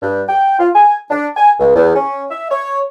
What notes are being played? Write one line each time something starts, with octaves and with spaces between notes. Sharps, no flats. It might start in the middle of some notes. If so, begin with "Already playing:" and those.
G2
G5
F4
G#5
D4
G#5
C#2
E2
C#4
E5
C#5